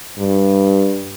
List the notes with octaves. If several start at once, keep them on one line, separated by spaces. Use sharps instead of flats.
G2